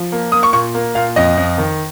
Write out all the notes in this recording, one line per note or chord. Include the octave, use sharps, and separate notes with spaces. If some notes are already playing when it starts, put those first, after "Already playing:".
Already playing: F3
A#3
A#3 D#6
C#6
A#2 C#6
A#3
A#2 F5
F2 D#5
F2
D#3